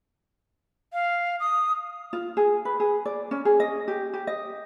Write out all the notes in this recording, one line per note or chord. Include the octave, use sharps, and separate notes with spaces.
F5
D#6
F4
G#4
B4
G#4
D5
C#4
G#4
D#5
G4
G4
D#5